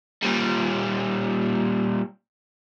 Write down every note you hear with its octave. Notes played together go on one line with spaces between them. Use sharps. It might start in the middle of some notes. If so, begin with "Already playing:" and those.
A#2 G3